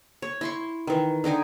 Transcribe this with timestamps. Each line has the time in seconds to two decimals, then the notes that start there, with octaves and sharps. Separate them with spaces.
0.22 C#5
0.41 E4 C6 C#6
0.87 D#3 E3
1.24 D3 D#4 G5 G#5